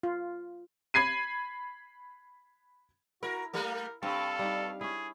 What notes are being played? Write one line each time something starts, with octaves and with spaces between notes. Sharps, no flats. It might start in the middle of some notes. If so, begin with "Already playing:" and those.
F4
B5 G#6 C7 D#7
E4 F#4 A#4
G3 A3 A#3 A#4
G2 C4 A4 F5
G3 D#4
C#4 E4 G#4